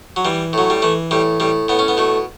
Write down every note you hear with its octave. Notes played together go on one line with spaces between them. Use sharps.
F#3
E3 G3
A2 F#3
G3
E3 A3
A2 G3
A2 G3
A2 B3
C#4
B3
B2 A3